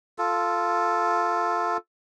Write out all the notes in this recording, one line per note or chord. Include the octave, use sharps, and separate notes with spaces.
F4 A4